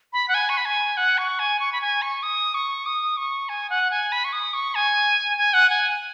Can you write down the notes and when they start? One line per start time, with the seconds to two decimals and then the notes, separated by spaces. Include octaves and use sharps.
0.13 B5
0.28 F#5
0.34 G#5
0.49 C#6
0.57 B5
0.65 G#5
0.97 F#5
1.18 C#6
1.39 G#5
1.60 C#6
1.73 B5
1.81 G#5
2.02 C#6
2.23 D#6
2.55 C#6
2.86 D#6
3.17 C#6
3.49 G#5
3.70 F#5
3.91 G#5
4.12 B5
4.24 C#6
4.33 D#6
4.54 C#6
4.75 G#5
5.38 G#5
5.54 F#5
5.70 G#5